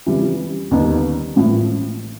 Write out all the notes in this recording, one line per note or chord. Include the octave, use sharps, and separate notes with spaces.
F2 C#3 E3 G3
D#2 D3 G3 B3 D#4
A1 A2 F3 A#3